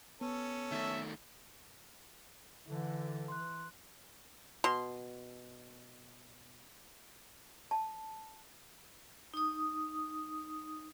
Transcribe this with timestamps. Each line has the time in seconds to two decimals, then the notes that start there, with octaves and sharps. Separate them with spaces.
0.21 B3 C#4 A4
0.72 D#3 A3 E5
2.68 D3 E3
3.28 C6 F#6
4.64 B2 C6
7.71 A5
9.34 D#4 D#6